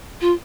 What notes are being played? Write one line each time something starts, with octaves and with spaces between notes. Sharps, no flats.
F4